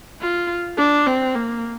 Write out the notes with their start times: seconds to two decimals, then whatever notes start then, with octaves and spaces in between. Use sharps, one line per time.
0.21 F4
0.77 D4
1.07 C4
1.35 A#3